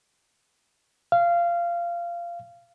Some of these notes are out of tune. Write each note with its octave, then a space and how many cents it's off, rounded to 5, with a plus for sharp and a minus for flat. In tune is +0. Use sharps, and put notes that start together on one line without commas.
F5 -20